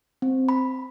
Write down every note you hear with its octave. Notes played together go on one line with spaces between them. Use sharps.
C4
B5